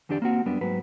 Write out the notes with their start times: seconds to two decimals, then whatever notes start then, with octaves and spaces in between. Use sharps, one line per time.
0.09 E2 D3 D4 G4 D5
0.22 A#3 C4 F#4
0.46 F#2 G3 B3 D4
0.61 G#2 F#3 B4